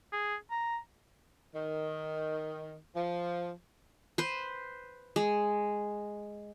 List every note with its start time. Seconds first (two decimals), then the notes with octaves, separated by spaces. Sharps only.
0.13 G#4
0.51 A#5
1.55 D#3
2.96 F3
4.18 B4 C5
5.16 G#3